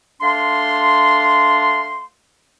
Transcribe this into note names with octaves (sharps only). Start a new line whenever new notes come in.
A3 D4 F5 C6